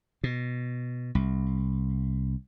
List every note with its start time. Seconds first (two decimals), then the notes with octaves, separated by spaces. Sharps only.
0.24 B2
1.15 C2